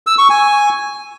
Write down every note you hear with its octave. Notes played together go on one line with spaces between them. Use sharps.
E6
C#6
G#5